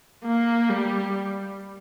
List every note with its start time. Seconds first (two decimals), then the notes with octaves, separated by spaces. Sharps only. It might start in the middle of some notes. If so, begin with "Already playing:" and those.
0.25 A#3
0.70 G3